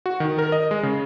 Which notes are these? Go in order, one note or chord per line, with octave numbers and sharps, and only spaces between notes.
F#4
D#3
A#4
D#5
G#3
C#3